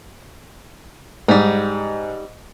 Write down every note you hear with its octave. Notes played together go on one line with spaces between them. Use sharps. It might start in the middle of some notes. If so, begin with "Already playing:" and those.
G#2 G3 D#4